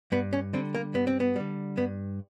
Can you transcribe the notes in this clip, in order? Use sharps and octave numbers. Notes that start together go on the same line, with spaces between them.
G2 B3
C#4
D3 G3 C4
A#3
G2 B3
C4
B3
D3 G3
G2 B3